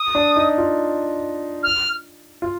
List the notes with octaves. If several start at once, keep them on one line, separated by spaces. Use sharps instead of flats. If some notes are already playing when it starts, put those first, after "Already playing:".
Already playing: D#6
D4
D#4
F4
F6
F4